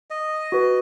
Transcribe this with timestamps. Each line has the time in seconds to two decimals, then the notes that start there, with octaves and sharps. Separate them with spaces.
0.10 D#5
0.52 F#4 B4